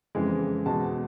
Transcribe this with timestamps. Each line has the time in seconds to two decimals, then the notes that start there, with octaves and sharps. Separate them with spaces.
0.15 F2 C#3 E3 G#3
0.66 E2 B2 G#3 A5